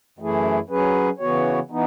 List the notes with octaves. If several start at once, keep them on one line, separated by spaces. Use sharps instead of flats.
F#2 E3 A3 E4 G#4
F#3 C#4 G#4 B4
C#3 E3 B3 F#4 C#5
E3 B3 D#4